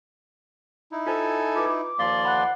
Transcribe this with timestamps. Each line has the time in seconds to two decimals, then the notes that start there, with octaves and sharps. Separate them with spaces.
0.92 D#4 E4
1.07 F4 A4 C5 G#5
1.56 F4 B4 D6
1.99 D#2 F3 A#3 D5 F5 C6
2.25 F#5 B5 F#6